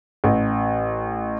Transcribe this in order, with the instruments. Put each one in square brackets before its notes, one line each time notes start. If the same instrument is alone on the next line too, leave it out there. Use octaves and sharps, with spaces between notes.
[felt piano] A1